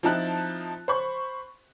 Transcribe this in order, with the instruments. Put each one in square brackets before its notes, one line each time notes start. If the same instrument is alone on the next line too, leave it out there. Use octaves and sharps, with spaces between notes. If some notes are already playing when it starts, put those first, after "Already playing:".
[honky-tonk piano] F3 C4 D#4 E4 A5 F#6
C5 B5 C#6